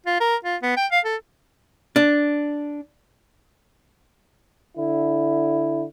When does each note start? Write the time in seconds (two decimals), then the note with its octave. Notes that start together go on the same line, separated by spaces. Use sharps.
0.06 F4
0.21 A#4
0.45 F4
0.62 B3
0.77 G5
0.91 F5
1.05 A4
1.96 D4
4.77 D3 E4